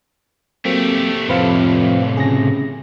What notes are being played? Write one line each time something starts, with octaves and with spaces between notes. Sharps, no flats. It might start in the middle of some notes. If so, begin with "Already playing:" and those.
F#3 A3 A#3 C4 G4
F2 A2 C3 B4 C5 F5
C#3 G#4 A#6